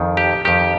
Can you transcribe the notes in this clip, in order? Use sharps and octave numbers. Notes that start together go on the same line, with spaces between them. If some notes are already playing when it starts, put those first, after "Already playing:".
Already playing: F2 D#3
G4
F2 D#3 G4